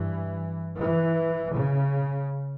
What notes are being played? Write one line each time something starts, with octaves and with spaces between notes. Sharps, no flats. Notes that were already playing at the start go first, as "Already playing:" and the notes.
Already playing: G2 E3
E3
C#3